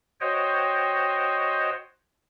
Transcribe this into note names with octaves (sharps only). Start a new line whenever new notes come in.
F#4 C5 C#5 D#5 G5